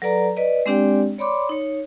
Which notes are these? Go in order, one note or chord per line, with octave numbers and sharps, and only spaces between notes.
F#3 A4 B4 D5 A#5
B4 D5 D#5
G#3 C4 D4 G4 D5 G5
C#5 D5 B5 C6 D6
D#4 C#5